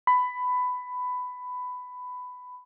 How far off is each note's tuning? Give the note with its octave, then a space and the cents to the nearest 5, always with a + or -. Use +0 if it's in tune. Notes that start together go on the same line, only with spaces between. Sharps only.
B5 +15